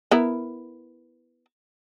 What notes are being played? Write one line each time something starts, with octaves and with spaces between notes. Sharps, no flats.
B3 E4 A#4